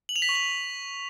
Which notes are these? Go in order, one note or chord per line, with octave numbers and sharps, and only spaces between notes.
F#7
F7
B6
C#6
F7